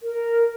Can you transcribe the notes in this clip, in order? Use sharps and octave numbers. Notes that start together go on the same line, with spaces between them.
A#4